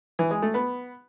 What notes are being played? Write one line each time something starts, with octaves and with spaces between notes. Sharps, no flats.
E3
G#3
A3
B3